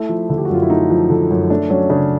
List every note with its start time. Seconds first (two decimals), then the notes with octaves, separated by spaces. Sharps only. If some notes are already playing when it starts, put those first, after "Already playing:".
Already playing: A3 E4
0.09 F3
0.30 D3
0.38 G4
0.45 F#4
0.50 F#2 F4
0.62 E4
0.70 A3 D#4
0.90 F3
1.10 D3
1.31 F#2
1.50 A3 D4
1.70 F#3 C#4
1.90 C#3 D4